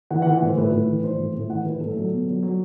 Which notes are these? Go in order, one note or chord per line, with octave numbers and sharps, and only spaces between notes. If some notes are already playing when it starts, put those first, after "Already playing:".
E3 F#5
F#5
E3
F#5
A2 C5
A2 B4
A2
E3
E3 C5
A2
A2
E3 F#5
E3 B4
A2 A4
F#3 A4
B2
F#3
F#3